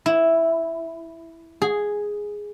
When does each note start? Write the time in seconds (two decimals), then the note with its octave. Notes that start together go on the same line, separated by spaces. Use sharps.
0.06 E4
1.62 G#4